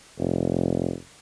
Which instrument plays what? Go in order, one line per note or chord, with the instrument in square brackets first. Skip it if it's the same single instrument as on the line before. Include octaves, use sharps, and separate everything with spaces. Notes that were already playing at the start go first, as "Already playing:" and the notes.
[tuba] F1